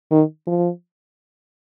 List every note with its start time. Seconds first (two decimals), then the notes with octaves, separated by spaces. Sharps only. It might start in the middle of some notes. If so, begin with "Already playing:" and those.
0.11 D#3
0.47 F3